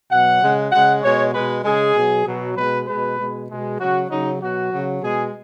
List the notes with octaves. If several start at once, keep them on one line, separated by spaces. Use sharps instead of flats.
B2 F#3 F#5
C#3 G#3
C#3 G#3 F#5
B2 G#3 C#5
B2 G#3 B4
C#3 G#3 G#4
B2 F#3
B2 F#3
B2 G#3 B4
B2 G#3 B4
B2 G#3
B2 G#3
C#3 F#3 F#4
C#3 F#3 D#4
B2 F#3 F#4
C#3 F#3
B2 G#3 G#4